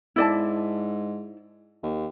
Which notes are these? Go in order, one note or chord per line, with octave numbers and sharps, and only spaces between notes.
G#2 E4 D5 A5
D#2